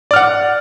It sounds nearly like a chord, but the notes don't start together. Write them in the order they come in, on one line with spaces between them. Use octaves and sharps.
D5 F6 F#5